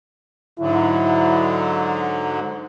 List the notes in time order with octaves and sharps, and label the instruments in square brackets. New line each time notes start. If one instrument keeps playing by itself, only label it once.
[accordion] G#2 D3 F#3 [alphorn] E4